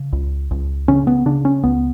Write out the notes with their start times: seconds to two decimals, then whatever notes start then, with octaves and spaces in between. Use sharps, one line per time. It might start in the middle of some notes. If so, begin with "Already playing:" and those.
Already playing: C#3
0.13 C#2
0.51 C#2
0.88 C#3 C#4
1.07 B3
1.26 C#3 D4
1.45 C#4
1.64 C#2 B3